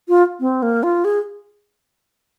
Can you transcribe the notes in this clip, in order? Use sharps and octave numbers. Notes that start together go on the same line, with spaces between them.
F4
C4
A#3
F4
G#4